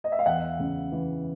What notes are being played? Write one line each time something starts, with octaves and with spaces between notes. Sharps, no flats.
D#5
E5
F5
E2 E5 F#5
C#3
E3